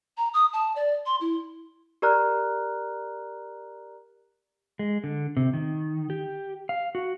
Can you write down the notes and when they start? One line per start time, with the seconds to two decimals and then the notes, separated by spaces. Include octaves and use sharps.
0.17 A#5
0.34 D#6
0.53 A5
0.76 D5
1.06 C6
1.21 E4
2.02 G4 A#4 D5 A#5 F6 F#6
4.79 G#3
5.04 D3
5.37 C3
5.54 D#3
6.10 G4
6.69 F5
6.95 F#4